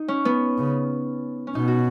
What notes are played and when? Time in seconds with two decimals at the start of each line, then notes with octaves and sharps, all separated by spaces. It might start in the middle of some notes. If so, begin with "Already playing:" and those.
Already playing: D#4
0.08 C#4
0.25 B3
0.58 C#3
1.47 C#4
1.55 B2 D#4
1.68 F#4